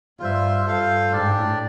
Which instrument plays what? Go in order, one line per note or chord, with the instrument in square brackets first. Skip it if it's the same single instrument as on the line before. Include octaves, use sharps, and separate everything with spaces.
[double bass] G2 [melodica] F4 C5 E5
[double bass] G2 [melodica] F4 A4 C5 F5
[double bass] A2 [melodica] D4 G4 D5